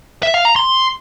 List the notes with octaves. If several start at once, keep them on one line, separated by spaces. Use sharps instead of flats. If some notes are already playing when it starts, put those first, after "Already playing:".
E5
F5
A#5
C6